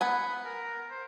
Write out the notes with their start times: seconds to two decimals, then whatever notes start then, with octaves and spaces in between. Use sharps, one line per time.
0.01 B3 F#5 G#5 B5
0.45 A#4
0.90 C5